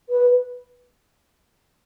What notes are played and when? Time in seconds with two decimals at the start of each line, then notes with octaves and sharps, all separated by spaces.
0.09 B4